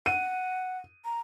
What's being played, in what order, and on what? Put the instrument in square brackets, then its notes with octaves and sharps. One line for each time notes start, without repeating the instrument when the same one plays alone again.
[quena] F#5 [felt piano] D#7
[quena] A#5